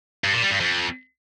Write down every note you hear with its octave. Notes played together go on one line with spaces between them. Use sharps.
G2
A#2
G3
G2
F2